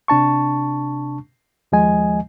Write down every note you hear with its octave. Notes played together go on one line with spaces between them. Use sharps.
C3 D4 A5 C#6
D#2 F3 G#3 D#5 G#5